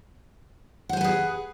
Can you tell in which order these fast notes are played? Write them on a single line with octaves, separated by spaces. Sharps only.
F#5 C5 G#5 B4 G#4